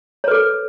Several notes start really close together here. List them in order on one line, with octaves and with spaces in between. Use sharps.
C#5 B4 A4